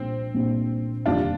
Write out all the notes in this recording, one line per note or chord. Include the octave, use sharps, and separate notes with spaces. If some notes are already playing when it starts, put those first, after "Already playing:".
Already playing: C2 A#2 F3 A#3 C4 D4
C2 A#2 F3 A#3 D4
F1 D#2 D3 G3 D4 F4